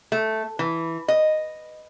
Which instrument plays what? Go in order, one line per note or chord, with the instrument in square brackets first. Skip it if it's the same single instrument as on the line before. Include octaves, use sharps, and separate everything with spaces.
[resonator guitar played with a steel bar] A3
E3
D#5